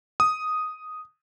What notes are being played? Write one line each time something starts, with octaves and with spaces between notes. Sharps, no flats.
D#6